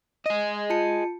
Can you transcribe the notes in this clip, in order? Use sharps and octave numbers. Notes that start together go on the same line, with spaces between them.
G#4 D#5
F4 A5 C#7